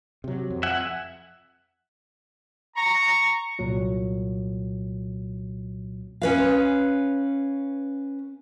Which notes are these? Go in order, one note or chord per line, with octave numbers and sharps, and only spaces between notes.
C3 F#3
F2
E5 F#5 G#5
A#5 C#6
C2 A#2 F#3
C#4 B4 F5